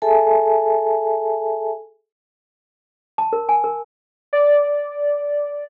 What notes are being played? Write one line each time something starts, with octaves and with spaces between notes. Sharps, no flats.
G#4 A4 E5 G#5 A5
A5
A#4
G#5
A#4
D5